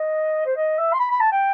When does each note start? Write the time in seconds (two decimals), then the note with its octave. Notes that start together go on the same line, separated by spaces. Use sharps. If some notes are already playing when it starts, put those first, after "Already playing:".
Already playing: D#5
0.46 C5
0.56 D#5
0.78 E5
0.93 C6
1.00 B5
1.11 B5
1.21 A5
1.32 G5